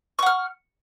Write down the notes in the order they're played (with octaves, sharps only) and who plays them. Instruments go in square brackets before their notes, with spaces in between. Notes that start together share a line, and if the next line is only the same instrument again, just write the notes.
[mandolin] C#6
F#5
F6